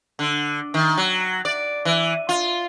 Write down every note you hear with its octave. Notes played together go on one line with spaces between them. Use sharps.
D3
D#3
F#3
D5
E3
F4